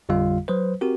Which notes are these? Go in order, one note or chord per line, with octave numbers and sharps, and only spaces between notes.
A1 F2 D3 G3 F4 F5
F#3 B4 C5
C4 F#4 G4 A#4